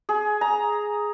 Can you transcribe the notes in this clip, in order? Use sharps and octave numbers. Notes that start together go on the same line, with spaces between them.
G#4
A#5